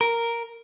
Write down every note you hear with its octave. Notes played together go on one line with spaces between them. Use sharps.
A#4